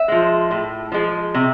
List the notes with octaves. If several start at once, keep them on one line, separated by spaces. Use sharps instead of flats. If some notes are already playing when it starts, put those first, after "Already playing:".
Already playing: E5
F3 G#3
A2
F3 G#3
C3